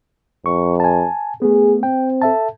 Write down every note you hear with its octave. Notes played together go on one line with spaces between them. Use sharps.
F2 C#6
G#5 A5
A3 B3 G#4
C4 G5
A4 E5 A5